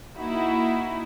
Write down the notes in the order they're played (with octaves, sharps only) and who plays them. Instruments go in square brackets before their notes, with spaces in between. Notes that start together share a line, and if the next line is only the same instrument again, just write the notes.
[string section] A#3 D#4 E4 F#4